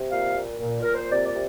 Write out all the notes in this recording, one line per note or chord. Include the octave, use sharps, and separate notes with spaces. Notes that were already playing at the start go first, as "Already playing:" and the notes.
Already playing: C3
A#2 F5
A#2
A#2
A#2 A#4
C5
C3 D5
D5
C3